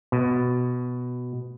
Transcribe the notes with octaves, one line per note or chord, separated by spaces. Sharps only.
B2